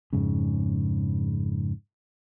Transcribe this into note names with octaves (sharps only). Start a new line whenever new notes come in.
F2 G#2 C#3